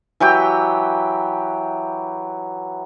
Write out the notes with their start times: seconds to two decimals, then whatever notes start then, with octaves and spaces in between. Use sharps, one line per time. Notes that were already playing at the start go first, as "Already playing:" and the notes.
0.20 E3 F#3 G4 G5